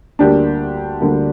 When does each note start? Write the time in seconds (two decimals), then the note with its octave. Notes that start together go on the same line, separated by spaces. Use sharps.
0.19 D2 D3 G3 A#3 D4 G4
1.00 D2 D3 G3 A#3